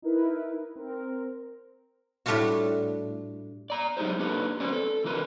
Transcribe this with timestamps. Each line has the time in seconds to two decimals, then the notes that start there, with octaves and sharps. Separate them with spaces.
0.02 D#4 E4 A#4 B4
0.76 C4 A#4
2.26 A2 G3 A3 D4 F4 F#4
3.70 D5 A#5
3.97 F#3 D#4 G4 G#4 C5
4.19 A#3 D4 G4 A4 B4
4.60 C#4 B4 C5 D5
4.73 A4
5.04 D3 E3 F4 A#4 B4